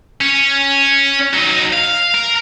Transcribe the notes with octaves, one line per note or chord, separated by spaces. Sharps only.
C#4
F#3 D#4
F5
A#4